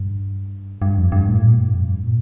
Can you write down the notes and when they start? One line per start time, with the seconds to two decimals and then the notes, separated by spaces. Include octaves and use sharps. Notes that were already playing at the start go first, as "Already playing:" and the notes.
Already playing: G2
0.82 G2
0.98 F2
1.12 G2
1.28 A2
1.42 A#2
1.58 G2
1.74 F2
1.88 G2
2.03 A#2